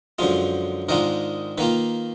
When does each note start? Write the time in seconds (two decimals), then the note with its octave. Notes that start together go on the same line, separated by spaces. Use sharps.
0.19 F#2 D3 F3 G#3 F4
0.89 G#2 D#3 G#3 D4 F4 A#4
1.58 D#3 A#3 F4 B4